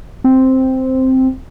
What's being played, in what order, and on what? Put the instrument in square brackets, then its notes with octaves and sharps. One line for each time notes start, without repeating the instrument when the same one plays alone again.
[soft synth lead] C4